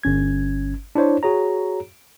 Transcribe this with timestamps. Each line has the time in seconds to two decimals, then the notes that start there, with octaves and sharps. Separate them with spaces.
0.03 G1 C#4 G#6
0.95 D4 E4 C5 C#5
1.23 F#4 G#4 C#5 A#5